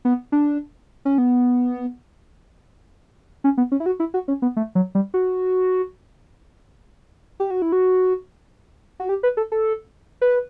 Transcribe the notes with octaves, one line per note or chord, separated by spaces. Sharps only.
B3
D4
C#4
B3
C#4
B3
C#4
E4
F#4
E4
F#4
C#4
B3
A3
F#3
G3
F#4
G4
F#4
E4
F#4
F#4
G4
B4
A4
A4
B4